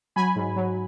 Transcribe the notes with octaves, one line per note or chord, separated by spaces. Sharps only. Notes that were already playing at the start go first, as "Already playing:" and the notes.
F#3 G#5 B5
G#2
F#3